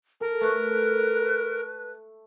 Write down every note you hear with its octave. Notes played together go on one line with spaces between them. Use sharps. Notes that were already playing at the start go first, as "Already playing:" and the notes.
A4 A#4
A3 B4